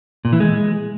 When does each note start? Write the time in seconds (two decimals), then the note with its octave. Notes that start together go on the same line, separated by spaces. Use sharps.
0.25 A#2
0.32 E3
0.40 G#3